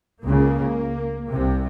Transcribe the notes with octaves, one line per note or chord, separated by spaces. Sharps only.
C#2 C#3 A#3
C2 C3